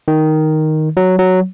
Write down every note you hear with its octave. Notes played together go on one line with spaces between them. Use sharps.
D#3
F#3
F#3